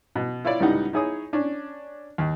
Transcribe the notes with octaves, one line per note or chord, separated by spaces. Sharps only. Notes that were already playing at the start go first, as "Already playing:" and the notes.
B2
E4 F4 C#5 D5
C#2 A2 G3 D#4 F#5
D#4 E4 G#4 C#5 D#6
C#4 D4
D#2